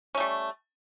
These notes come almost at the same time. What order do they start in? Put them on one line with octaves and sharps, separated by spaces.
C#4 A3 G3